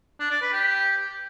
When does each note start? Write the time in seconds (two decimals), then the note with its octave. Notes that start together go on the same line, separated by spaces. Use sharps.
0.20 D4
0.31 D5
0.42 B4
0.53 G4